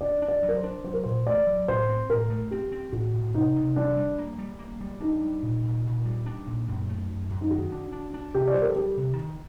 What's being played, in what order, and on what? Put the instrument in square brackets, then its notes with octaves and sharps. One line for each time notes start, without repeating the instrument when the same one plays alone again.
[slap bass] D4 [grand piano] D5
[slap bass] D4
[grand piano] D5
[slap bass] F#3
[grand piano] A#4
C5
[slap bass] D4
[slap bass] F#3 [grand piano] C5
[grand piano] A#4
[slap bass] A#2 [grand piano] C5
[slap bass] A3 [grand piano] D5
[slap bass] F#3
[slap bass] A2 [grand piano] C5
[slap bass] C4
[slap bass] A2 [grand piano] A#4
[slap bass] A3
[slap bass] C4 [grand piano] G4
[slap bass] C4
[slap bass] A2 [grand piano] F#4
[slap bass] A2
[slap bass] C3 [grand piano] D#4
[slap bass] C3
[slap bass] G3 [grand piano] D4
[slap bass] G3
A#3
G3
A#3
G3
[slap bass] D4 [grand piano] D#4
[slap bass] G3
A#2
A#2
A#2
G3
D4
A#2
F#2
A3
F#2
F#2
[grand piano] D#4
[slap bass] D#3 [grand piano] F#4
[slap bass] D4
D4
D4
[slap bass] C3 [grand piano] G4
[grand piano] D5
[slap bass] G3 [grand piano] C5
[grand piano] A#4
A4
[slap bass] G3 [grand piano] G4
[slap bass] C3
D#3